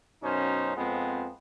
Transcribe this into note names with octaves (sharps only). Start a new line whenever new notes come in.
F#2 B2 C#4 D#4 C5
F2 F3 G#3 B3 C4